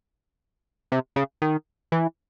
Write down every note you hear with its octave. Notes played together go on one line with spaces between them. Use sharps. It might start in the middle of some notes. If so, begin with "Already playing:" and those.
C3
C#3
D#3
E3